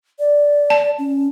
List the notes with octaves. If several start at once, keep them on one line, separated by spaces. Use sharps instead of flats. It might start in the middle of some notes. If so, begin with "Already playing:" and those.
D5
A5
C#4